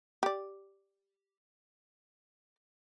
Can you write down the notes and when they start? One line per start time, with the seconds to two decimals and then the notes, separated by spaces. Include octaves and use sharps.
0.23 G4 D5